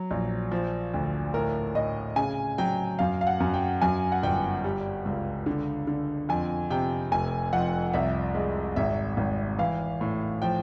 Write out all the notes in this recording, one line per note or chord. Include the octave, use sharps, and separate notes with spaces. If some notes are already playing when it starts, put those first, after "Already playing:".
Already playing: F#3
A#1
F3
D2
A2 A#4
A2 D#5
C#3 G#5
F#3 G5
F#2 F5
F5
F#5
F#2
G5
F#2 G#5
F#5
G1 G5
G3
C#2
D3
D3
F2 G#5
C3 G5
F1 G#5
F2 F#5
C2 E5
G#3
G#1 E5
G#1
E3 F5
A2
F3 G5